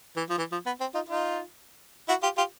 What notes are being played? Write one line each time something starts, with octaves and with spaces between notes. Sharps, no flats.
E3
F3
E3
F3
B3
C4
D#4 F4
D#4 F4
E4 F#4
F4 G4
F4 G4